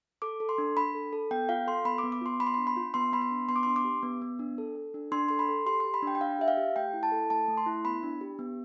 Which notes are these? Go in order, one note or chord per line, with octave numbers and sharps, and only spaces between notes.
A4 D6
A4
C6
D4
D4 B5
A4
A4
B3 G5
F4 F5
A4 C6
B3 B5
D6
B3
D6
F4 C6
B3 B5
C6
B5
D4
B5
F4
B3 C6
B3 B5
C6
D4
B3 C6
D6
C6
D4
D6
G4
B3
B3
D4
A4
A4
D4
D4 C6
A4 C6
B5
A4
G4 C6
C6
G4
B5
D4 G5
G5
D4 F5
G4 E5
F5
G4
A3 G5
E4
A5
A4
A3 A5
A3
C6
E4
B3 B5
D4
G4
B3